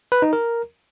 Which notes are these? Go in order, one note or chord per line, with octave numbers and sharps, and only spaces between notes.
B4
D#4
A#4